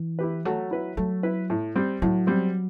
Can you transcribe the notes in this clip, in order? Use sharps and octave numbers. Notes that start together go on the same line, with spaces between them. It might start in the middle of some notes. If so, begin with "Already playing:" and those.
Already playing: E3
E4 G4 B4
F#3 A3
E4 B4
F#3 A3
E4 B4
A2
G3 C4
A2 F#3
G3 C4